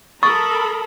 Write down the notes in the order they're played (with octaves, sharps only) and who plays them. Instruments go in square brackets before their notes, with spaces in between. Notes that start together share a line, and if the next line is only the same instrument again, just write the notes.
[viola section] A4 A#4 B5 [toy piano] C#6 [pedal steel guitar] D#6 [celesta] A6